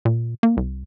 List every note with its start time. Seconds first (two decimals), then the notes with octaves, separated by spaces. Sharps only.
0.05 A#2
0.43 A#3
0.57 C2